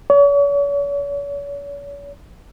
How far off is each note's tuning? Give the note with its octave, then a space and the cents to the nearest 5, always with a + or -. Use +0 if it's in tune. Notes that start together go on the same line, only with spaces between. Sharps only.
C#5 +40